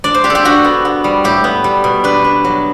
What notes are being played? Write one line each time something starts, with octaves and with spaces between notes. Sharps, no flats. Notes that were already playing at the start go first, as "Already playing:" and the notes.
D4 D5
C5
D4 G4
A4
G4
D4 F#4
B3
B3
G3
A2 G4
B3
G3
B2
D4 B4
D4
F#3